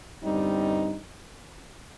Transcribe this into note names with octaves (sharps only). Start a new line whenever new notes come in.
G1 G2 G3 C4 D#4